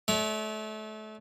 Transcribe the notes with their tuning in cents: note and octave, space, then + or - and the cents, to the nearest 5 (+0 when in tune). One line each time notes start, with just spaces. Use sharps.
A3 -30 D5 -40